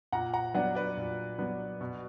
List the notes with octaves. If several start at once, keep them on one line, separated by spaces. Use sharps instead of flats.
A#2 F#5 A#5
F#5 A#5
F#3 B3 D4 D5 F#5
B4 D5
A#2
F#3 B3 D4
B2